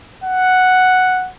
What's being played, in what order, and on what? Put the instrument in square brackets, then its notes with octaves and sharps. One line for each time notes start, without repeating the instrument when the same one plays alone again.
[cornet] F#5